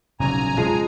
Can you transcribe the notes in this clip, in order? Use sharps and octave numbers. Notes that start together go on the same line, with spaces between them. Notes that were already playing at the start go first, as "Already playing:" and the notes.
F1 B1 A#2 C#3 G#5 A#5
F3 G#3 C#4